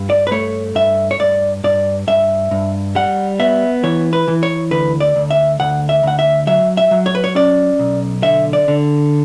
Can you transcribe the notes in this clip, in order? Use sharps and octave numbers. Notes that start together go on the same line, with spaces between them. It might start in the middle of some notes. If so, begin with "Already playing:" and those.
Already playing: G2
D5
B4
A3 C#5
G2 E5
C#5
G2 D5
G2 D5
G2 E5
G2
G3 F#5
B3 E5
E3 C#5
B4
E3
C#5
D2 B4
D5
D2
E5
D2 F#5
E5
D2 F#5
E5
F#3 E5
E5
F#3
C#5
B4
C#5
C#4 D5
B1
D3 E5
D5
D3